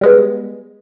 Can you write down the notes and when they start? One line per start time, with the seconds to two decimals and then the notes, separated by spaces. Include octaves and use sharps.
0.01 G3 G#3 B3